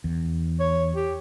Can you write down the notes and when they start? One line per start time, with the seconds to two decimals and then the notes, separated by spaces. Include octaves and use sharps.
0.04 E2
0.60 C#5
0.95 G4